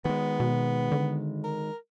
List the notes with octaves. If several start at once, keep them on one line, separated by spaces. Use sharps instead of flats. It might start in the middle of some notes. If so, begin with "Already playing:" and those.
D#3 G#3 B3
B2
D3
A#4